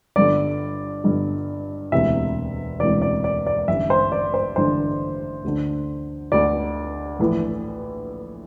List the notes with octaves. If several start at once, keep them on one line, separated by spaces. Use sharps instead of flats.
G1 G2 D3 D5
G1 G2 D3
E1 D2 C3 E3 E5
E1 D2 C3 E3 D5
D5
D5
D5
A1 G2 D3 E5
C5
D5
C5
A1 G2 D3 C5
D2 D3
D2 D3 D5
A#1 A2 E3